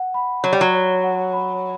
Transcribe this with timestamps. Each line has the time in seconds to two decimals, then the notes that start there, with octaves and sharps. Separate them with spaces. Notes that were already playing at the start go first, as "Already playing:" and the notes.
Already playing: F#5
0.14 B5
0.43 F#3 C#5
0.53 G3
0.61 F#3
0.74 C#5
1.03 F#5
1.33 B5